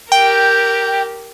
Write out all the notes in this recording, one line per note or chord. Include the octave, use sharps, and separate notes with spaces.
G4 A#4 G5